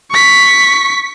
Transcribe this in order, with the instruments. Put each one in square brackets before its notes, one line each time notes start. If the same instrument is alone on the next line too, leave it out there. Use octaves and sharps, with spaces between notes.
[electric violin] C#6 B6